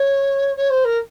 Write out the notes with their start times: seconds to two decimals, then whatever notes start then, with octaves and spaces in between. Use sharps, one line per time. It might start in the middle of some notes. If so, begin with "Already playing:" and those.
Already playing: C#5
0.57 C#5
0.70 C5
0.85 A#4